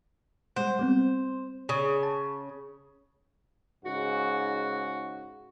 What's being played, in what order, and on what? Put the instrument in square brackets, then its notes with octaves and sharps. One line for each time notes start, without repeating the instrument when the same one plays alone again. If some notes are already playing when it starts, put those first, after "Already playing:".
[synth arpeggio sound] G3 G#3 F#5 [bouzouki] C5
[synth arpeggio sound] G3 B3 C4
[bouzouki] C#3 [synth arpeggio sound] G#4
[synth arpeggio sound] A5
[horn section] G#2 C#3 F#4